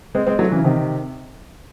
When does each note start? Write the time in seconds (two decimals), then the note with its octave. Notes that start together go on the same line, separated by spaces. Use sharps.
0.15 G#3 C4
0.27 G#3 C4
0.39 F#3 A3
0.52 C#3 E3
0.64 C3 D#3